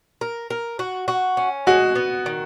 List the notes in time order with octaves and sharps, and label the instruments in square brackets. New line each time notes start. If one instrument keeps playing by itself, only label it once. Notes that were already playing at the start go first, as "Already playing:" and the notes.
[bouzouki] A#4
A#4
F#4
F#4
C#4
[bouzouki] G#3 [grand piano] F#4
[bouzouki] B3
D#3